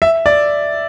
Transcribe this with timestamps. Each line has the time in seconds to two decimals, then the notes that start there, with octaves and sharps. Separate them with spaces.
0.02 E5
0.26 D5